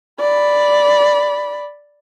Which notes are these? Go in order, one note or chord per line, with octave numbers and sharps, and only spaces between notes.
D5 B5